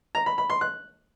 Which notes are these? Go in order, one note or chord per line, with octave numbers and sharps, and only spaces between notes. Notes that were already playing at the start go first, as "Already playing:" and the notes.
A#5
B5
B5
C6
F#6